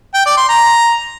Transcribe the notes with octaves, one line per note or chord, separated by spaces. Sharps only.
G5
D5
C6
A#5